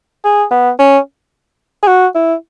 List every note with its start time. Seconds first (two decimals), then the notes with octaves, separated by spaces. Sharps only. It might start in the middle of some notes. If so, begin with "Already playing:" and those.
0.25 G#4
0.51 B3
0.79 C#4
1.83 G#4
1.87 F#4
2.15 E4